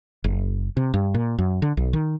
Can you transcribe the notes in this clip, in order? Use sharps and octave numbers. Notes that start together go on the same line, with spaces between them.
F#1
C3
G2
A#2
F#2
D3
B1
D#3